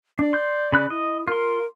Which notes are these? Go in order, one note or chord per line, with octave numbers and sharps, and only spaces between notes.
D4 D5
C6 G6
C#3 B5 F#6
E4 D#5
F4 A#4 C6